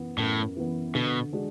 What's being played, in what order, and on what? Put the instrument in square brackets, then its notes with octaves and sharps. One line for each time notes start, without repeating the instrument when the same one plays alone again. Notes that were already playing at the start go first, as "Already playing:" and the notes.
Already playing: [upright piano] F#2 E3 B3
[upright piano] F#2 [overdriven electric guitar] A2
[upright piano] E3 B3
[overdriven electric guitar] B2 [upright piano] D3
[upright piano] G#3 D4 F#4